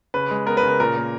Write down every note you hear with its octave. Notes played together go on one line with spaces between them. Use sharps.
C#3 B4
G#3
B3 A#4
B4
C#3 A#4
A#2 A#4
A#3